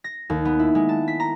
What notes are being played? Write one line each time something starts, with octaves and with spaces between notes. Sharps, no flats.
A#6
D#2
B3
E4
G#3
A5
B6
A#5